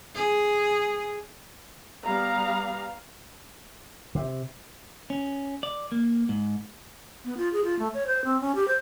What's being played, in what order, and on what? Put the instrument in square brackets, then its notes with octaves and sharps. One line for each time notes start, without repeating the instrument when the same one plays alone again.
[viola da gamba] G#4
[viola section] G3 B3 F5 A#5
[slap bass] C3
[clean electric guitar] C#4
D5
A#3
G#2
[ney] B3
F4
G#4
F4
A3
C#5
C5
C4
C#4
G4
C5